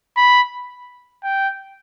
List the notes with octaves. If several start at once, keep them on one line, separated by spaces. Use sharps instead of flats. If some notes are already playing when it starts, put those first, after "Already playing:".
B5
G5